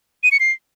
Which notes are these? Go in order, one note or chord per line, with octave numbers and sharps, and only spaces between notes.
D#7
C#7
C7